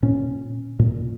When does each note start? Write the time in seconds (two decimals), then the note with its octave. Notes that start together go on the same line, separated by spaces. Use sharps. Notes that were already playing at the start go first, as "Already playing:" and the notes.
0.02 A#2 C#4
0.79 A#2